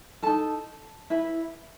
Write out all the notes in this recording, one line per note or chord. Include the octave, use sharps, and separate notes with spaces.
D#4 A4 A5
E4 B4